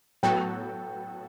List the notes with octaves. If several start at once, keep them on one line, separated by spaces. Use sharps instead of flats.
A2 F#3 B3 F#4 A4 G5